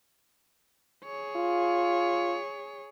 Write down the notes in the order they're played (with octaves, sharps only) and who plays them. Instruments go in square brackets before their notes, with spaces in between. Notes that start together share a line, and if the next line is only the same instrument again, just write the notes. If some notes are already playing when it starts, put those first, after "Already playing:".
[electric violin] G#4 C#5
[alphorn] F4